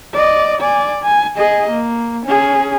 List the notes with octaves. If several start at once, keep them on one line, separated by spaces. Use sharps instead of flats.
D5 D#5
D5 G#5
G#5
G#4 D#5
A#3
C#4 G#4